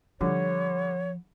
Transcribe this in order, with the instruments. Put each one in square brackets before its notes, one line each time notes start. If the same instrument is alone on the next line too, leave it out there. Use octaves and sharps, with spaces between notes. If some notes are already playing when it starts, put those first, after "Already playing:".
[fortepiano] D3 G3 [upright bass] F3 [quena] C#5